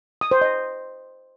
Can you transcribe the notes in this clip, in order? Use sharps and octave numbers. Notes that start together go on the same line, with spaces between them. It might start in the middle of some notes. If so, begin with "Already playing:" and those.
D#6
C5
D#5